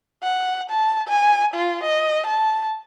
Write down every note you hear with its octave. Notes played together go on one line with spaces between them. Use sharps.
F#5
A5
G#5
F4
D#5
A5